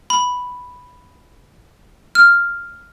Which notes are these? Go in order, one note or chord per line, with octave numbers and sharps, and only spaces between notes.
B5
F6